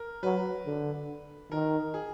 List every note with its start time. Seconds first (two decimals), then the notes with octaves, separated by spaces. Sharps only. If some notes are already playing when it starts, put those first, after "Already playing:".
Already playing: A#4
0.23 F#3 B4
0.66 D3
1.51 D#3 A#4
1.94 G#4